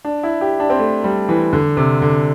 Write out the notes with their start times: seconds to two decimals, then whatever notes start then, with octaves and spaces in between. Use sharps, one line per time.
0.05 D4
0.23 E4
0.41 G4
0.60 D4
0.70 C4
0.79 A3
1.04 G3
1.29 E3
1.53 D3
1.77 C3
2.02 D3